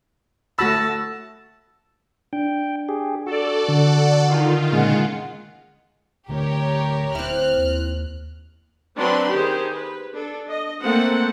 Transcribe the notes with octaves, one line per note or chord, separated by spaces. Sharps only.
A3 F#4 A5 B5 E6 A#6
D4 G5
G4 G#4
F#4 A4 D5
D3 F#5
D#3 F4
A#2 C#3 G#3 F#5
D1 D3 A3 G4 A#4 C#5
D1 C4 E4 F6 F#6
D#2
F#3 C4 D4 B4 B5 C6
D#3 G4 G#4 C5
B4
D4 A4
D#5
A3 A#3 C4 C5 F#5